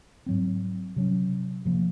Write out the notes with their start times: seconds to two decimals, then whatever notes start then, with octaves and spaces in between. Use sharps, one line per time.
0.26 G#2 F#3 C4
0.96 C3 F#3 C#4
1.65 C3 F3 A#3